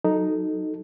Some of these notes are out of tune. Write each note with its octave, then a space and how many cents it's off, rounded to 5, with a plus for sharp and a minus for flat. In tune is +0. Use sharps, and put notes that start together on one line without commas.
F#3 +0 D#4 +0 A4 +0